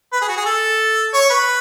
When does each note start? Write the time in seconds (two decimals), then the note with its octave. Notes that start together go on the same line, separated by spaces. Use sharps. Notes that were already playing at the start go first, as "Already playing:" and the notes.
0.13 B4
0.22 G#4
0.29 F#4
0.37 G#4
0.46 A4
1.14 C#5
1.30 B4